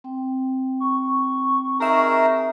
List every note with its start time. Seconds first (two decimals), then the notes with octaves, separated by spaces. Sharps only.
0.04 C4 G5
0.80 C#6
1.80 D#4 G#4 A#4 E5 A#5